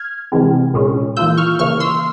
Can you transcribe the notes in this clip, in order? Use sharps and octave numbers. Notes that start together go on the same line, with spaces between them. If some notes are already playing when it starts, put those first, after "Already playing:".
Already playing: F6 G#6
C3 E3 G#3 C4
A#2 G#3 C#4
E3 A#3 F4 E6 G6
C#6 F6
C#3 E3 A#3 C#6 F6
C6 E6